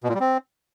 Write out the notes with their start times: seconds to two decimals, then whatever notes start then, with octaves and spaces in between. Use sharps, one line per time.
0.04 B2
0.09 A#2
0.15 G3
0.20 C4